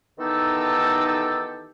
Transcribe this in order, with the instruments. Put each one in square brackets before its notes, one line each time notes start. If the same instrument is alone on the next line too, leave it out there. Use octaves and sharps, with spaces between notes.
[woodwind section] D#3 E3 B3 D#4 G4 A4